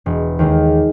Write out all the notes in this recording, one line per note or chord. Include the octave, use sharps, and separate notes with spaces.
E1
D#2 D#3 G#3